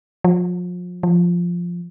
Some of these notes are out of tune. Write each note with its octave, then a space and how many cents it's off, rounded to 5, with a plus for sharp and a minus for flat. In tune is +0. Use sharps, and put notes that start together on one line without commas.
F3 +35
F3 +0